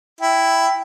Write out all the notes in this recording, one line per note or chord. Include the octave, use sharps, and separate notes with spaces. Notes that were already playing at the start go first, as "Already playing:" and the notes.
E4 G5